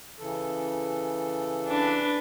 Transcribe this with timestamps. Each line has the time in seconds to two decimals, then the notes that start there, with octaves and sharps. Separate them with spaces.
0.19 C#3 E3 A4
1.67 D4 B4